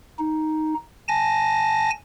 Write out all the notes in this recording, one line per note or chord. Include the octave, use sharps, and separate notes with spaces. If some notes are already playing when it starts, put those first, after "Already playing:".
D#4
G#5 A5 A#6